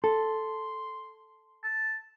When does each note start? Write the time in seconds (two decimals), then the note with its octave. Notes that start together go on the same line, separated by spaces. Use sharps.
0.04 A4 C6
1.64 A5